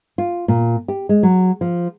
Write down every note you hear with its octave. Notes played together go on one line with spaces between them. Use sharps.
F4
A#2
G4
G#3
F#3
F3